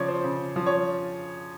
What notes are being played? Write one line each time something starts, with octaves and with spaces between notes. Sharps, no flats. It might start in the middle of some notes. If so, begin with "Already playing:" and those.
Already playing: C#3 F3 C#5 D5
C5
C#3
F3
C#5